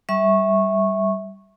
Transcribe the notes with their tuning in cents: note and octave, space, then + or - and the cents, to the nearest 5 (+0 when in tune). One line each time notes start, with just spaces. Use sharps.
G3 -5 E5 -10 C#6 -15